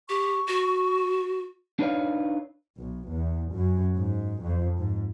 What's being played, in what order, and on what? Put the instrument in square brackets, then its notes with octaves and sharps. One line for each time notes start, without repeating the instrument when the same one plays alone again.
[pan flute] G4 [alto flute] C#6
[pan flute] F#4
[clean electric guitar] D4 D#4 B4 C#5 D5 F5
[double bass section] B1
E2
F#2
G#2
F2
G#2